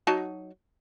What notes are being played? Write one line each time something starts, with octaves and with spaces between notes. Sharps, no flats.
F#3 D#4 A5